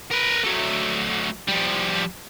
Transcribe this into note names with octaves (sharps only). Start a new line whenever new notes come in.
A#4 B4
F#3 A3
F3 G3